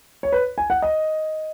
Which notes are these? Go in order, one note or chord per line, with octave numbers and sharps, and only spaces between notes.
C#5
B4
G#5
F#5
D#5